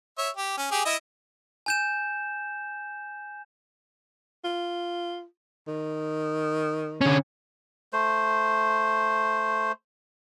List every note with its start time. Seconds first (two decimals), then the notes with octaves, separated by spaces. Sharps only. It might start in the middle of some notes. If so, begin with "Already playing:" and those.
0.18 C#5 E5
0.37 G4
0.57 C#4
0.71 G4 G#4
0.85 E4 D#5 E5
1.66 G#5 G6 E7
4.44 F4
5.67 D#3
7.01 D3 C#4
7.93 A3 C5